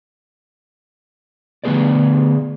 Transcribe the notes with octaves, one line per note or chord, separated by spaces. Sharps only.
D3 A3 B3 G#4 B4 D5